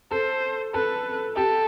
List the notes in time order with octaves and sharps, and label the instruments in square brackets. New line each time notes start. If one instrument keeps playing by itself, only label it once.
[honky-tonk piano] A4 [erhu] C5
[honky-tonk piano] A4 [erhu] B4
[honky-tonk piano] G4 [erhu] A4